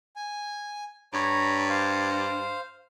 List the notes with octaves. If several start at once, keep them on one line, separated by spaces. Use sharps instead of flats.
G#5
G2 C#5 A#5 B5
C5 F5